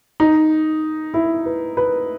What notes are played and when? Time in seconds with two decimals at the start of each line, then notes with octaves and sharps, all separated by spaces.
0.20 D#4
1.14 E4
1.46 B4
1.77 B4